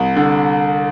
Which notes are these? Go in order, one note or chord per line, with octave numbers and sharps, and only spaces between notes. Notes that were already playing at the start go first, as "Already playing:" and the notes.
Already playing: C2
D3